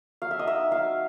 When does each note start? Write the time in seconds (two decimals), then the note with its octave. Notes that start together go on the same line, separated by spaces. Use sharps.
0.22 F#3 F5
0.31 E5
0.39 D#5
0.46 D#4 E5
0.71 F#3 F5